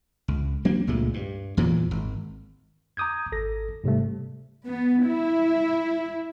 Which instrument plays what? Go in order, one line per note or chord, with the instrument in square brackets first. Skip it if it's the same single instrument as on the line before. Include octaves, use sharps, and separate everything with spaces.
[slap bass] C#2
F#3 A#3 C4 D4
C#2 A#2 G#3 A3
G2
E2 A#2 E3 F#3
G#1
[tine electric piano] A#5 D6 D#6 G6 G#6
G#1 A4 A#6
G#2 C3 G3 A3
[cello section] B3
E4